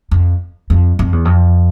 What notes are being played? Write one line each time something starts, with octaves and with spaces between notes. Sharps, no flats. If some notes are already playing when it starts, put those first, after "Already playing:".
F2
F2
F2
E2
F2